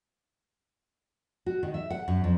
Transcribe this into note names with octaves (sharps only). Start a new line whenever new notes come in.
F#4
D#3
E5
F#5
F#2
F2